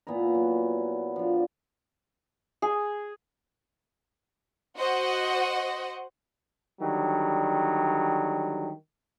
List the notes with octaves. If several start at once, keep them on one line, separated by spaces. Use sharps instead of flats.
A#2 B3 E4 A#5
F#3
F3 D4
G#4
F#4 C5 D#5 F#5
D3 D#3 F#3 G3